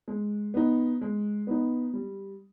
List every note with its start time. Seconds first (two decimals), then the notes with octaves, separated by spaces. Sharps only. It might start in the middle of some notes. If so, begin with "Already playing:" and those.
0.08 G#3
0.54 B3 D#4
1.01 G#3
1.47 B3 D#4
1.94 G3